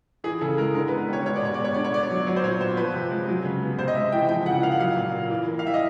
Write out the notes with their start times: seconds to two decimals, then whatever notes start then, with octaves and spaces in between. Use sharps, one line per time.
0.24 E3 G#4
0.41 C#3 A4
0.58 G#3 A#4
0.74 D3 A#4
0.88 B4
0.92 B3
1.09 G3 C#5
1.25 G#3 C#5
1.36 D5
1.43 B2 C#5
1.54 D5
1.59 B3
1.64 C#5
1.74 D3 D5
1.84 C#5
1.93 B3 D5
2.03 C#5
2.10 F#3
2.26 F#3 C#5
2.36 C5
2.43 A#2 C#5
2.60 B3 C5
2.77 F3 B4
2.94 C3
3.11 G#3
3.28 F#3
3.44 C#3
3.62 B3
3.79 C3 C5
3.88 D#5
3.95 G#3 E5
4.12 E3 G5
4.29 F3 G5
4.46 C#3 F#5
4.63 A#3 F5
4.72 F#5
4.80 F#3 F5
4.97 A#2
5.13 A#3
5.30 E3
5.48 A#3
5.59 F5
5.65 G3 E5
5.74 D#5